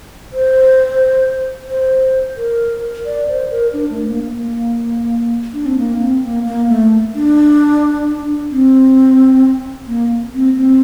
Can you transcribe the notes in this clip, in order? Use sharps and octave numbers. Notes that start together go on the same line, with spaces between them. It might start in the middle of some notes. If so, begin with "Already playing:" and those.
C5
C5
A#4
D5
C5
A#4
D4
A3
A#3
A#3
D4
C4
A#3
C4
A#3
A#3
A3
D4
C4
A#3
C4
C4